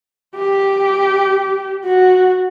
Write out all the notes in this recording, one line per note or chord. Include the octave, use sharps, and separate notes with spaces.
G4
F#4